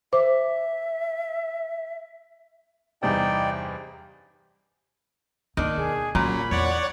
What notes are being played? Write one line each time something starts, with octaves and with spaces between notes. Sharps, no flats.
C5 E5 D6
E2 G2 C3 D#4 D5 G5
D#2 D#3 D4
B2 G#4
A#2 F#3 C#4 B5
E2 C#5 D5 F#5